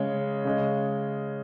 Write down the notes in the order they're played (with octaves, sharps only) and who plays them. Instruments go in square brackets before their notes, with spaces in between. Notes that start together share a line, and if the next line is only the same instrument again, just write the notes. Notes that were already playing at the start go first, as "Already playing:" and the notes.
Already playing: [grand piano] C#3 G#3 C#5
C#3 G#3